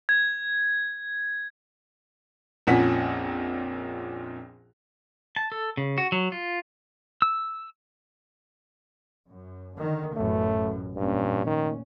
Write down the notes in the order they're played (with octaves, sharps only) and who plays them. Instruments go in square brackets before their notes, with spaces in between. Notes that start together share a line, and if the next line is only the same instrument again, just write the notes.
[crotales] G#6
[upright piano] A#1 F2 A#2 C#4 F#5 B6
[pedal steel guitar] A5
A4
C#3
F#4
F#3
F4
E6
[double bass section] F#2
D3 D#3
[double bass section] A1 F#2 B2 [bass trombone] A3
[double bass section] F1 A#2 C#4 [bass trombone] G2
[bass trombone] D#3